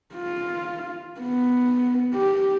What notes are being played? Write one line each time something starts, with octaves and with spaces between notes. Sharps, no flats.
F4
B3
G4